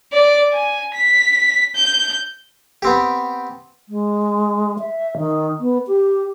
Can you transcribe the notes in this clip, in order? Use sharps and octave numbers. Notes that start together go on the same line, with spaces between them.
D5
G#5
B6
G6
B3 C4 G4
G#3
E5
D#3
B3
G4